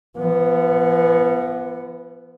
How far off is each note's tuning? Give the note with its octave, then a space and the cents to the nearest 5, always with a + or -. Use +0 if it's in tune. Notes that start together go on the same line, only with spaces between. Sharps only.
F3 -45 B3 +0